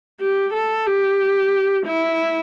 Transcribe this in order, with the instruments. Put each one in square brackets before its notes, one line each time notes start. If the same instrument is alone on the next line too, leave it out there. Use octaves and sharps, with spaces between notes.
[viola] G4
A4
G4
E4